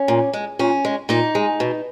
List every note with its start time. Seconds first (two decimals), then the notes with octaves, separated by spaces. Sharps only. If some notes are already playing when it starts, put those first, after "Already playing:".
Already playing: C#4
0.08 A#2
0.33 G#3
0.59 A#2 C#4
0.85 G#3
1.09 A#2 D#4
1.35 G#3
1.60 B2